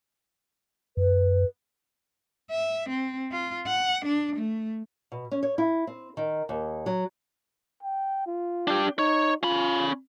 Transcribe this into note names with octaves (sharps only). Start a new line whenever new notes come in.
F#2 B4
E5
C4
F4
F#5
D4
A3
B2
C#4
C#5
E4
C4
D#3
D#2
F#3
G5
F4
D4 G4
D#4 C#5
C#4 F4 B5